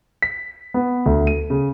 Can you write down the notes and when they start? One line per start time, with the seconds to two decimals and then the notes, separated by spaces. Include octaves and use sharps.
0.22 B6
0.74 B3
1.06 D2
1.27 D#7
1.50 C#3